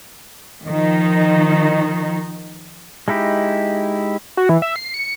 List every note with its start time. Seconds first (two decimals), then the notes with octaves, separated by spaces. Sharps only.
0.64 D#3 F3 D#4
3.08 G#3 D#4 E4 G4
4.37 F#4
4.49 E3
4.62 E5
4.76 C7
4.94 C#7